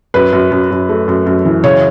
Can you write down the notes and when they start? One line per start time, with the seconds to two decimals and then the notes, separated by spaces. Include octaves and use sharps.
0.14 F#2 B4
0.33 F#2
0.51 F#2
0.71 F#2
0.89 A3
1.08 F#2
1.26 F#2
1.45 E3
1.64 C#3 C#5